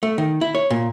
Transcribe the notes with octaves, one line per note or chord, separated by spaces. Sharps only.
A3
D#3
E4
C#5
A#2